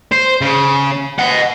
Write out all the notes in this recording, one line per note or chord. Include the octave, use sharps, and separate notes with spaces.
C5
C#3
D#5 F#5